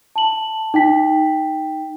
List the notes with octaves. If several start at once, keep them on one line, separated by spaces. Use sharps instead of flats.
A5 F#7
D#4 G5 B6